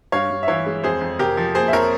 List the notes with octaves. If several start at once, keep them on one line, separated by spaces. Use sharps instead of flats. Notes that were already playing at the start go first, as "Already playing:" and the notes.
G2 C#5 F5
G2
E5
E3 C#5 F5
G#3
F2 G#4 C5
F2
C3 G4 A#4
F3
A#3 G#4 C5
E5
F2 A#4 C#5